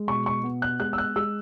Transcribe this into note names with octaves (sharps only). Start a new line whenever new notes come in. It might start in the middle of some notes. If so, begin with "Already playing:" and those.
Already playing: G#3
B2 C#6
C#6
B3
F#6
G#3 F#6
E6
F#6
G#3 E6